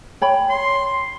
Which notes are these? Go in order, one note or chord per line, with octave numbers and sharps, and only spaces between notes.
C#5 G5 B5
C6